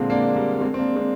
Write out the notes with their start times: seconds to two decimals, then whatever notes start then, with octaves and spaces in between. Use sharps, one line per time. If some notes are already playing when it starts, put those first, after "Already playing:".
Already playing: A#2 D3 G#3 C4
0.10 A#3 D4
0.36 G3 A#3
0.61 G#3 C4
0.74 C4
0.79 A#3 D4
0.96 G#3 C4